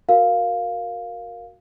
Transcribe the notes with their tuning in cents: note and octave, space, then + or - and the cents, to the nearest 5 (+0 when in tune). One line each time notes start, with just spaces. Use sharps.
F#4 -5 A#4 +0 F5 +0